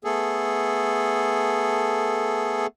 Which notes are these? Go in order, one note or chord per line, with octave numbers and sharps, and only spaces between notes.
A3 B3 G#4 A4